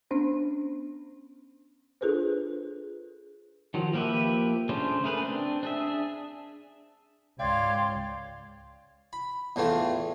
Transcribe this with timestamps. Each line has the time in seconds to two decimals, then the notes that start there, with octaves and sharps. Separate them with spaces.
0.11 B3 C#4 D4 C5
2.01 D4 F4 G#4 A4 B4 C5
3.74 D#3 F3 F#3
3.93 F3 A#3 G4 B4 E5
4.69 C#3 A3 C#4 D4 C5
5.04 A3 G#4 A#4 B4
5.22 C4 D4
5.63 D4 G#4 E5
7.39 C#2 G#2 C#5 D5 F5 G5 C6 G#6
9.13 B5
9.56 E2 A2 E3 A3 F4